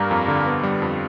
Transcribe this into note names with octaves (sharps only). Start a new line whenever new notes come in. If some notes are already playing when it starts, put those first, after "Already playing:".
Already playing: G2 G3 A#3
F2
D3
B3
G3
F2